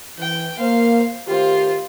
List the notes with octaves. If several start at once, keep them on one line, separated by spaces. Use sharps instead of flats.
E3 G5
A#3 C5 F5
D#3 A3 F4 G4 C5